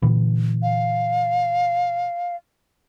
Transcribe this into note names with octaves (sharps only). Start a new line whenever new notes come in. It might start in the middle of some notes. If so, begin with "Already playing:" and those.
A#2 D3 E3
F5